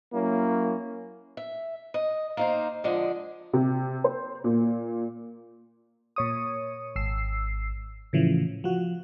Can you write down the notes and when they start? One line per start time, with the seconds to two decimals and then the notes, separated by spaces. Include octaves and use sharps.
0.13 F#3 A#3 C#4 E4
1.37 E5
1.94 D#5
2.37 A#3 D#4 C5
2.84 D3 F3 G#3 D5 D#5
3.53 C3
4.04 C5
4.44 A#2
6.16 A#2 C#5 D#6
6.96 G#1 E6 C7
8.13 A2 C#3 E3 F3
8.64 F3 F#4